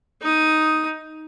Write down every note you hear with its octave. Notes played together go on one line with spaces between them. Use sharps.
D#4 D#6